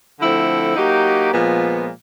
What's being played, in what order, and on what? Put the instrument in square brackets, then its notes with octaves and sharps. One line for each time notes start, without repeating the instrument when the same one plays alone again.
[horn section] D3 F3 A3 C4 E4
F#3 A#3 D#4 G4
A#2 F3 G#3 B3